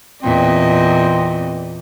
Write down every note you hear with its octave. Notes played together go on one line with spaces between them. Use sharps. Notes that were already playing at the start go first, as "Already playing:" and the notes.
E2 A#2 C4 D#5